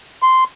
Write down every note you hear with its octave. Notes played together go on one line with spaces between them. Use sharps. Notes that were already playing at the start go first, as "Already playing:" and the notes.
C6